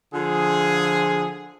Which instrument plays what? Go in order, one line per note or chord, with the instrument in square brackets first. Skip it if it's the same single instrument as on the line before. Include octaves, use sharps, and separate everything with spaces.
[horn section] D3 F3 F4 G#4